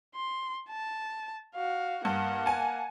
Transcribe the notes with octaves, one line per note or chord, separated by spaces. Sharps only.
C6
A5
F#4 F5
G2 A#3 F#5
G#5 A5